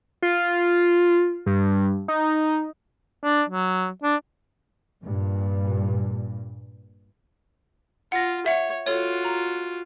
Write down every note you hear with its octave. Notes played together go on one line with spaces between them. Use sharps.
F4
G2
D#4
D4
F#3
D4
G2 A#2
F4 F#5 A#6
C#5 E5 F#5
F4 F#4 A4 C#5
A#5